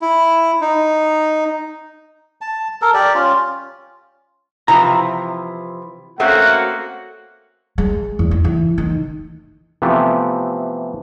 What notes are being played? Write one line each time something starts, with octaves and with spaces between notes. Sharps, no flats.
E4
D#4
A5
A4 A#4
G4 D5
C#4 F4
C3 E3 F3 A#5
A3 A#3 C4 C#4 F#4 F#5
G#3
E2
D#3
E3
D#3
C3 E3 F3 A3 B3 G4